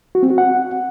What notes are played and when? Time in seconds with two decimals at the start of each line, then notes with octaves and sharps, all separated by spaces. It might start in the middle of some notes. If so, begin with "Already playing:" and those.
0.15 F#4
0.23 C4
0.30 F#4
0.38 F#5